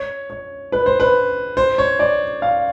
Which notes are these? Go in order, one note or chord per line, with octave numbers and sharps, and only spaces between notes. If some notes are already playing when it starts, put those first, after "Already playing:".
Already playing: C#5
C#5
B4
C5
B4
C5
C#5
D5
F5